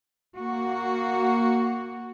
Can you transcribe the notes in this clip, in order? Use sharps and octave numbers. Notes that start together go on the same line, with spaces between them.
A#3 F#4